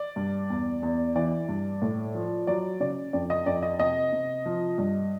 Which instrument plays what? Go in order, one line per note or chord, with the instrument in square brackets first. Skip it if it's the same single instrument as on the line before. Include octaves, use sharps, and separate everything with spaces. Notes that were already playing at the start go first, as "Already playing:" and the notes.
Already playing: [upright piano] D5
G2
E2
E2
E3 D5
G2
A2
F3
F#3 D5
C#3 D5
F2 D5
D#5
F2 D5
D#5
C3 D#5
C3
F3
G2